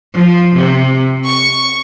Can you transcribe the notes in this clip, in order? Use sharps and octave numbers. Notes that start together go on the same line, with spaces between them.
F3
C3
C#6